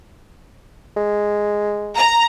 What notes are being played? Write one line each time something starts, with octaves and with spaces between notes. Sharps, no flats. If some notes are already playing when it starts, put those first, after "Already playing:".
G#3
A#5